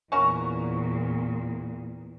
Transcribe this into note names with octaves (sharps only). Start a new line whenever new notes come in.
E2 A#2 C#4 F#4 A#4